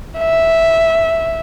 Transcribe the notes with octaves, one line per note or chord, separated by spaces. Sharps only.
E5